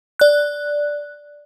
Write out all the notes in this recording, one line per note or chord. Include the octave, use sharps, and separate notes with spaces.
D5 F#6